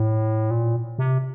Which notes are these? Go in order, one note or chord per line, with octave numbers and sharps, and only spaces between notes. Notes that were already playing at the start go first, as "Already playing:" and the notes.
Already playing: A2
A#2
C3